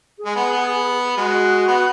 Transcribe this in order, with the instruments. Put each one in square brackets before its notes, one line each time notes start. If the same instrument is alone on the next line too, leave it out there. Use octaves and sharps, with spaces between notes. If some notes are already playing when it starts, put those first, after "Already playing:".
[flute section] G#4
[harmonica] G#3
B3
B3
[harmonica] G#3 [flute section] F#4
[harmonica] B3